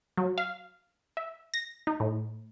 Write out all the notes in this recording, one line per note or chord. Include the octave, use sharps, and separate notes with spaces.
F#3
F5
E5
A#6
D#4
A2